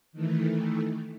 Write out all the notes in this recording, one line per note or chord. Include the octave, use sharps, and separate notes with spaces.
D#3 E3 A3